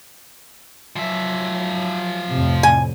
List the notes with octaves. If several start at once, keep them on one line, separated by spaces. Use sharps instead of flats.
F3 F#3 E5
F2 A2 C3
G#5